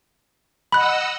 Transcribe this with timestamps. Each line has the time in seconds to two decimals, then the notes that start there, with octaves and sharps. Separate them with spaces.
0.72 D#5 F#5 B5 E6 F#6